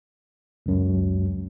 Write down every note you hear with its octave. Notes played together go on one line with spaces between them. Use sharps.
C#2 F#2